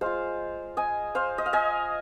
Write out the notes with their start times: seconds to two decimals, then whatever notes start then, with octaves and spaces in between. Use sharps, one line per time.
0.01 G#3 F4 C5 F5
0.77 D#5 G#5
1.15 C5 F5
1.38 D#5
1.46 F5
1.53 D#5 G#5